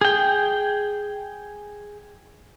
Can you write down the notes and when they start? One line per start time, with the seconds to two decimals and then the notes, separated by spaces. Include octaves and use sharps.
0.01 G#4 G5